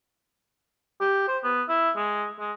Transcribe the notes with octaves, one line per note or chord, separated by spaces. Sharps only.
G4
C5
B3
E4
G#3
G#3